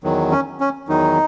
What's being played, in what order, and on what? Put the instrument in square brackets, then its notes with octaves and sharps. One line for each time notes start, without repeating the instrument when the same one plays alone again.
[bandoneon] E2 D#3 F#3
C#4
C#4
E2 D#3 F#3 D#4